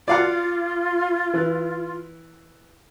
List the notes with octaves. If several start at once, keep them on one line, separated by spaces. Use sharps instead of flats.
F4 D5 F5 F#5
E3